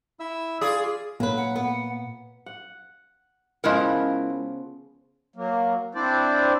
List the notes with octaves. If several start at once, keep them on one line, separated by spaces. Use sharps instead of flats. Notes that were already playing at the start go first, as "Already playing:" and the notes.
E4 E5 E6
F4 G#4 D5
A#2 F#3 A#3 B4
F#5
B3
F#5
C#3 F3 G#3 B3 E4 A#4
F#3 A#3
C4 D4 E4 C5 D5